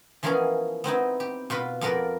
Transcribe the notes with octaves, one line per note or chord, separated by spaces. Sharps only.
E3 F3 A#3 B3 C#4 G#4
B3 C4 D#4 E4
G4
B2 F4 B4 B5
F2 B3 F4 A#4 B4 D5